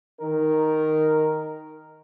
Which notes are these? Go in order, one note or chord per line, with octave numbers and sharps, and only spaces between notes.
D#3 D#4 A#4